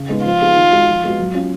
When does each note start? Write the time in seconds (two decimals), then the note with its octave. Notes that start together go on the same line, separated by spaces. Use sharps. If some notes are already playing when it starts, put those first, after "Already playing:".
Already playing: C#3
0.09 G#3 B3 D#4
0.25 F3 F4
0.41 B3 D#4 G#4
0.56 D#3
0.72 G#3 D#4 F#4
0.88 F3
1.04 G#3 B3 F#4
1.19 F#3
1.34 C#4 F4